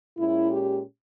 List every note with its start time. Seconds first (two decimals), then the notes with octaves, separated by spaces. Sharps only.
0.17 A#2 G#3 C#4 E4
0.50 G4